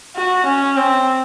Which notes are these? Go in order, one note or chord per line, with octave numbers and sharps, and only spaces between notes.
F#4
C#4
C4